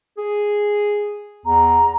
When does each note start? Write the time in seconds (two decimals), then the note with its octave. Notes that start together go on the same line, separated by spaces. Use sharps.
0.18 G#4
1.46 E2 A#5